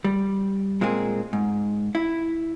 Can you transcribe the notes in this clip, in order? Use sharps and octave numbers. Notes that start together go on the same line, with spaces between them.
G3
A#2 G#3 A#3 C4 G#4
G#2
E4